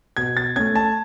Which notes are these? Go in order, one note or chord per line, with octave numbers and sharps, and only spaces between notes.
B2 G#6
A6
A3 C#4 G#6
A5